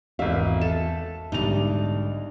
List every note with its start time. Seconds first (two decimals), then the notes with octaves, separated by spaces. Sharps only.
0.19 G#1 E2 E5 F5
0.61 A4 E7
1.32 B1 G#2 D3 G3 D4 D#4 F7